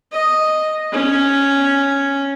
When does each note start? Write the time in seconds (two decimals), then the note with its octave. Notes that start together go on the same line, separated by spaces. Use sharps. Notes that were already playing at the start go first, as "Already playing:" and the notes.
0.12 D#5
0.92 C#4